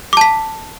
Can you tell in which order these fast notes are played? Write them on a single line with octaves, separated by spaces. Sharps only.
D6 A5 B6